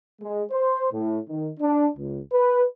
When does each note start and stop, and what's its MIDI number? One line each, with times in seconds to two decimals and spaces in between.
0.21 0.43 56
0.51 0.87 72
0.93 1.19 45
1.29 1.50 51
1.60 1.87 62
1.97 2.19 37
2.33 2.64 71